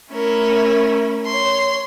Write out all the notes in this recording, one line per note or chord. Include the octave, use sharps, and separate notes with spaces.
A3 C#4 E4 A#4
C#5 C6